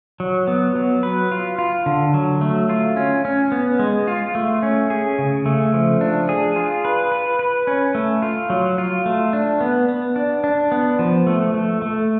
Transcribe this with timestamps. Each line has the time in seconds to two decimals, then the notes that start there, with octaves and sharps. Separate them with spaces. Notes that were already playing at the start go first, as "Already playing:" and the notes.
0.20 F#3
0.48 B3
0.76 F#3
1.03 B4
1.31 F4
1.59 F4
1.86 D3
2.14 F#3
2.41 A3
2.69 F4
2.97 C#4
3.25 C#4
3.52 B3
3.79 G#3
4.07 F4
4.35 A3
4.63 C#4
4.90 G#4
5.19 C#3
5.46 A3
5.74 F3
6.01 D4
6.29 G#4
6.56 F4
6.85 B4
7.12 B4
7.39 B4
7.67 C#4
7.95 A3
8.22 F4
8.50 F#3
8.78 F4
9.06 A3
9.33 D4
9.61 B3
9.89 B3
10.16 D4
10.44 D4
10.72 B3
10.99 F3
11.27 A3
11.54 A3
11.82 A3